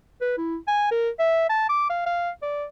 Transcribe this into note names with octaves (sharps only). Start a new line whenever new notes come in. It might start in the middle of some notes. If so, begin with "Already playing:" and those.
B4
E4
G#5
A#4
E5
A5
D6
F5
F5
D5